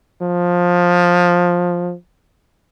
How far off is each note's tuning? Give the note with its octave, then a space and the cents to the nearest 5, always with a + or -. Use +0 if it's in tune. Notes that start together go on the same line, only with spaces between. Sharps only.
F3 +15